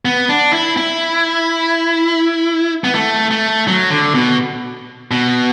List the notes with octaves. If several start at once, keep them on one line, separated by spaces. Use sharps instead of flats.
B3
D4
E4
E4
B3
A3
A3
F#3
D3
B2
B2